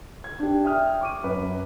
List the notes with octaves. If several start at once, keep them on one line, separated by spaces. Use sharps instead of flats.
G#6
D4 G4
E5 G5 D#6 F6
C#6 D6 D#7
F#2 B4